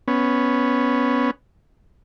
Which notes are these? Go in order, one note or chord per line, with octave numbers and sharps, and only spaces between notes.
B3 C#4